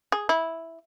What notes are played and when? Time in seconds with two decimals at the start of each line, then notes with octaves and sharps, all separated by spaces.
0.12 G#4
0.29 E4